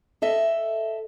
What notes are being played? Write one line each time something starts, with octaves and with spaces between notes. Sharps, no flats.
A4 D#5 E5